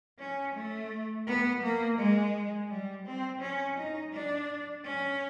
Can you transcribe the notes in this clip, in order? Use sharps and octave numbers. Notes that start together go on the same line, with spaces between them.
C#4
A3
B3
A#3
G#3
G3
C4
C#4
D#4
D4
C#4